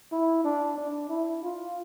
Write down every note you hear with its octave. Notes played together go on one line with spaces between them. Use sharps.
E4
D4
D4
E4
F4